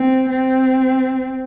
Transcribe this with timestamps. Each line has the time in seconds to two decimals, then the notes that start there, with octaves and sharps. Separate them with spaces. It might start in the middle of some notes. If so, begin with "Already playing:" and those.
Already playing: C4
0.29 C4